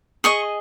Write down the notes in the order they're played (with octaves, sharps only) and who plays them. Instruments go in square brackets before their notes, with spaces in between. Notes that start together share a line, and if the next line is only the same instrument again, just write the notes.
[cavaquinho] G#4 D#5 C#6